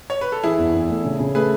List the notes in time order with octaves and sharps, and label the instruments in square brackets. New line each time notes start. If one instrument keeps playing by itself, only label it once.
[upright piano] C#5
B4
A4
[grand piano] E3 [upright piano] E4 G#4
[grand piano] E2
E2
A3
C#3
C#3
[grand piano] A3 [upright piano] G#4 B4